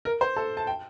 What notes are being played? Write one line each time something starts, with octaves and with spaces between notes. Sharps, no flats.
A#4
C5
A4
A5
G5